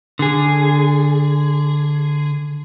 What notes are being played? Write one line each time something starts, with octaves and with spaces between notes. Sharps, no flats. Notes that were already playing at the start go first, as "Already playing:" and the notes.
D3 G#4